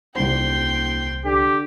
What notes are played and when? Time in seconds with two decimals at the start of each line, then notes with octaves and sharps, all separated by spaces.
0.16 D#1 C2 C5 G5 C6
1.25 D3 G4